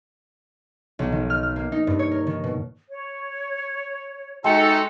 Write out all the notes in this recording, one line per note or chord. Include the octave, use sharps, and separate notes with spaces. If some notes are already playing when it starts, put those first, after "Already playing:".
B1
D#3
F6
F6
A#3
D#4
G2
C#5
A#4
D#3
B2
C#5
G#3 D#4 F#4 A4 E5 G5 C#7